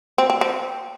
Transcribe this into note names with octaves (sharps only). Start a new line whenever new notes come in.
C4
C4
C4